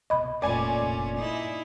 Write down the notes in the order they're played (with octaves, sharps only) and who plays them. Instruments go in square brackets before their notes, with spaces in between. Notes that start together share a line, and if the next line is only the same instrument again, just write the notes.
[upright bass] C2 B2 [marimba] D#5 B5
[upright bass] F1 [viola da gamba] A#2 A3 C#4 [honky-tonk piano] D5 G#5
[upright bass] F1 A#1
[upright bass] G2 [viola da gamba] D#4 E4